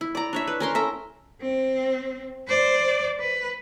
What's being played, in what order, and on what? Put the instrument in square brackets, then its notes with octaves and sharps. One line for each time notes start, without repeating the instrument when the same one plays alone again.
[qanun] E4
D5 A#5
D4 C#5 E5
B4
C#4 A#4 C6
A4 E5 A#5
[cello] C4
C5 D5
B4